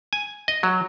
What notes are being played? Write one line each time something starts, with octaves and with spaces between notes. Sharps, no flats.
G#5
D#5
F#3